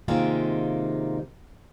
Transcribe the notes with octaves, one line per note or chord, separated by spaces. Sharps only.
C3 D#3 G#3 A#3 F4